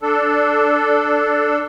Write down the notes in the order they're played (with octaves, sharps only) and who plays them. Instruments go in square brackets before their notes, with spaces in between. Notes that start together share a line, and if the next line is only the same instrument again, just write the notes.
[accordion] D4 A4